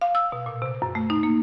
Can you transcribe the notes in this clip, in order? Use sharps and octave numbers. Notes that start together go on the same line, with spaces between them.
F5
E6
B2
A#2
C3
F#2
A3
D#4
A#3